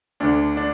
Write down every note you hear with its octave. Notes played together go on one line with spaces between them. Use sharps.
D2 D3 D4
D4